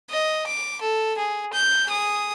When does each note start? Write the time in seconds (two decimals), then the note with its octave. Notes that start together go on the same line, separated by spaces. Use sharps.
0.11 D#5
0.47 D6
0.82 A4
1.18 G#4
1.53 G6
1.87 G#4 D#6